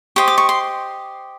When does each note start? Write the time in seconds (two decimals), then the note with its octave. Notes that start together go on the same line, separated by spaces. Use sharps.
0.16 G4 C5 D#5 C#6
0.28 D6
0.38 C#6
0.49 C6